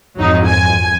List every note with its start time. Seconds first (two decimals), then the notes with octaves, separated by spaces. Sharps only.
0.17 G#1 F2 F#3 D#4
0.47 G#5